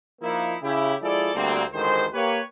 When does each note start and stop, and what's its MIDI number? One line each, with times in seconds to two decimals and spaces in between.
0.21 0.55 53
0.21 0.55 58
0.21 0.55 63
0.21 0.55 64
0.62 0.94 49
0.62 0.94 64
0.62 0.94 67
1.02 1.30 53
1.02 1.30 56
1.02 1.30 64
1.02 1.30 68
1.02 1.30 69
1.02 1.30 74
1.35 1.62 38
1.35 1.62 55
1.35 1.62 58
1.35 1.62 60
1.73 2.04 33
1.73 2.04 38
1.73 2.04 51
1.73 2.04 56
1.73 2.04 72
2.13 2.39 58
2.13 2.39 67
2.13 2.39 71
2.13 2.39 73